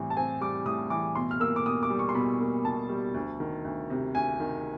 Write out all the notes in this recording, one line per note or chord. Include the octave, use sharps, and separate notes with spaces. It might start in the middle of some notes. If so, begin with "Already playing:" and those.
Already playing: A2 E3 G3 C4
A5
C4 G#5
G3 D6
A2 D#6
E3 D6
B2 C6
F6
A#3 E6
D6
B2 D#6
D6
G3
C#6
C6
B2 B5
A#3
B2 A5
G3
D2
D#3
D2
C3
D2 G#5
D#3